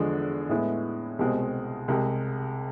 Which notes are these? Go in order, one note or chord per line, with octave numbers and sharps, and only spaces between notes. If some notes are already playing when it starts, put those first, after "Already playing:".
Already playing: E2 D3 F3 G#3
A2 G#3 B3 E4
C2 B2 G#3 C4
C2 C3 G#3